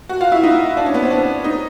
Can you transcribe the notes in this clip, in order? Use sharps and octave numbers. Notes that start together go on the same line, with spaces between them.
F#4
F4
E4
D#4
D4
C#4
B3
C4
D4
D#4